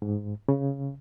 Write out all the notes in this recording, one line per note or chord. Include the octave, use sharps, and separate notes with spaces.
G#2
C#3